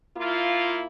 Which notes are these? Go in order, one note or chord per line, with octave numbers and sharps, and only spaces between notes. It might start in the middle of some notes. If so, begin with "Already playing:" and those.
A#3 E4 F4